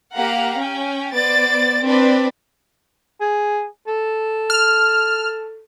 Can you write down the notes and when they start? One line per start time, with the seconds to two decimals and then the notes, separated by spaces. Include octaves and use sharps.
0.12 A#3 G4 F5 F#5 A#5
0.58 C#4 G5
1.14 B3 C5 D5 A6 D7
1.82 C4 D4 B4 D5
3.20 G#4
3.87 A4
4.50 F6